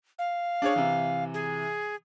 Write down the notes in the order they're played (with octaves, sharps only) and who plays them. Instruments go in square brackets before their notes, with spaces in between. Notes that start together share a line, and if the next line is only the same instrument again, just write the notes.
[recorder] F5
[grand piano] D4 G#4 C#5
C3 E3
[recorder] G#4